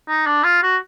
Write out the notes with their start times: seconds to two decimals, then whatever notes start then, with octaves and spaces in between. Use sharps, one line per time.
0.08 D#4
0.27 D4
0.44 F4
0.63 F#4